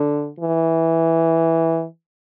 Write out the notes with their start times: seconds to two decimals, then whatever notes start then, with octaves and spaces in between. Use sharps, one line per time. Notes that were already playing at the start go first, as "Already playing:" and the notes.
Already playing: D3
0.40 E3